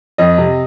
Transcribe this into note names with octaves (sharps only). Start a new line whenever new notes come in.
F2 D#5
C3